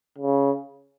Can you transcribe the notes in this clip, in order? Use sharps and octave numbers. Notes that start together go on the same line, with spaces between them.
C#3